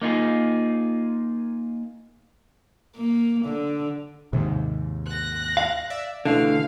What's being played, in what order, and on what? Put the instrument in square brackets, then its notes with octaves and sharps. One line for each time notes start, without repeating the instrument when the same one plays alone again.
[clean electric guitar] A#3 D#4 F4 G#4
[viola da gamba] A#3
D3
[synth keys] D#2 G#2 [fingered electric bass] C3 D#3
[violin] F#6 A#6
[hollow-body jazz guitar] F5
[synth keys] D5 E5
[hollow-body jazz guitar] D2 D3 [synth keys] B2 E3 [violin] F5